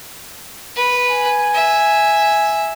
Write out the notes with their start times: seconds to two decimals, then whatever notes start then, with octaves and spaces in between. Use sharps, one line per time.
0.76 B4
1.09 G#5
1.54 E5